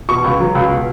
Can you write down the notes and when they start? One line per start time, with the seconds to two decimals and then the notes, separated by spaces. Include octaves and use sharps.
0.09 B2 C#6
0.24 C#2
0.40 F#3
0.55 C#2
0.71 B2